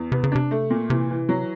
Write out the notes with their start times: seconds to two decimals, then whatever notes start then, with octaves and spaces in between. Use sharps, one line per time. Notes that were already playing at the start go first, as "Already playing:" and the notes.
Already playing: E2
0.12 C3 B3
0.24 C#3
0.32 C3 D4
0.51 A3
0.70 A#2
0.90 C3 E3
1.10 E3
1.29 F#3